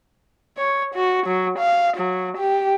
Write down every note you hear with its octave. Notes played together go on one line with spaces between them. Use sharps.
C#5
F#4
F#3
F5
F#3
G4